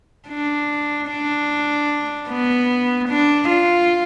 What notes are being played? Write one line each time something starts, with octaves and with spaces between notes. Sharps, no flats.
D4
D4
B3
D4
F4